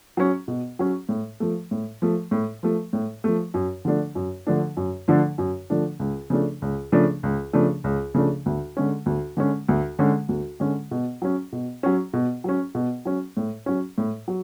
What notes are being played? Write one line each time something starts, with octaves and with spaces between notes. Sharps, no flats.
F#3 C#4
B2
F#3 C#4
A2
F3 A3
A2
F3 A3
A2
F3 A3
A2
F3 A3
F#2
D3 F3 A3 D4
F#2
D3 F3 A3 D4
F#2
D3 F3 A3 D4
F#2
D3 F3 A3 D4
C#2
C#3 F3 A3 D4
C#2
C#3 F3 A3 D4
C#2
C#3 F3 A3 D4
C#2
C#3 F3 A3 D4
D2
D3 G#3 C#4
D2
D3 G#3 C#4
D2
D3 G#3 C#4
D2
D3 G#3 C#4
B2
F#3 C#4
B2
F#3 C#4
B2
F#3 C#4
B2
F#3 C#4
A2
F#3 C#4
A2
F#3